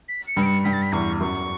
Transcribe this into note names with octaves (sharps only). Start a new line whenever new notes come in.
B6
C#7
G2
D7
C#7
G2 B6
A6
B6
E2 C#6
F#2 C#6